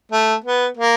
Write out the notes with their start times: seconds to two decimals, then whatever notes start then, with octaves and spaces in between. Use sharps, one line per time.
0.12 A3
0.44 B3
0.77 A#3